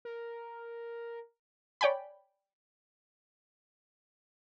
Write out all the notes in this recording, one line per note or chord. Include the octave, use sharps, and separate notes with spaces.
A#4
C#5 D5 G5 G#5 B5